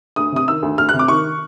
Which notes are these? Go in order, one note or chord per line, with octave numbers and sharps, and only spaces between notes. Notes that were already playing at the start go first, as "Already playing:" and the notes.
D2 D#6
C3 D#6
D#3 E6
D2
D2 F6
C3 F#6
D6
D#3 C#6